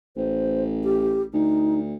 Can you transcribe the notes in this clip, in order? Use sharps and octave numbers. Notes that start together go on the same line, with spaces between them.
A1 C5
G4
D2 D#4